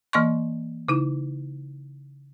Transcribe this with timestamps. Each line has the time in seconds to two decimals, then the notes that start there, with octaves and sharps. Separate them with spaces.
0.13 E3 A#3 D#5 C6 C#6
0.88 C#3 D#4 E4